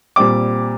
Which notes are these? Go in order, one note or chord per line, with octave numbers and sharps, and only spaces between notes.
A#2 G3 C4 D6